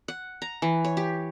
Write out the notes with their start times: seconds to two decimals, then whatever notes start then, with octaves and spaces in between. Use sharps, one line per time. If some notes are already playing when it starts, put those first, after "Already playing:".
0.08 F#5
0.42 A#5
0.62 E3
0.84 C#5
0.97 G4